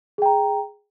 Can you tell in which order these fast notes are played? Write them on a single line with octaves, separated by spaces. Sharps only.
G#4 G5 A#5